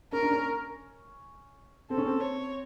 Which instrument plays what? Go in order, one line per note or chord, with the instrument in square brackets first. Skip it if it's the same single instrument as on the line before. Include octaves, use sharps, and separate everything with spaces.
[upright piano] C#4 [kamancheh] A#4
[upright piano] D4
C#4
[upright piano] C4 [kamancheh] A4
[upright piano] C#4
C4
[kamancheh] C#5